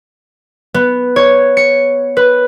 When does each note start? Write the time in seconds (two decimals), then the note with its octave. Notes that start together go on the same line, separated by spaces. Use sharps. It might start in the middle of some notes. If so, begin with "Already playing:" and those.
0.74 B3
1.16 C#5
1.57 C#7
2.17 B4